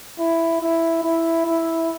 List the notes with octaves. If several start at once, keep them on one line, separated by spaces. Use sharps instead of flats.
E4
E4
E4
E4